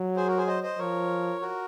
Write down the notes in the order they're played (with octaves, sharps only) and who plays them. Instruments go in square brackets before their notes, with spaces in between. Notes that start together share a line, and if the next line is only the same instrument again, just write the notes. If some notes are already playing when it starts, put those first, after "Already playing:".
Already playing: [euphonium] F#3
[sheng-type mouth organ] G#4 C5
F#4 A#4
G#4 C5
C5 D#5
C5 D#5
[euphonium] F3 [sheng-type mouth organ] A#4 C#5
[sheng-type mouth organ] F#4 A#4